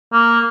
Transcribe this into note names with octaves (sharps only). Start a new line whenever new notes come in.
A#3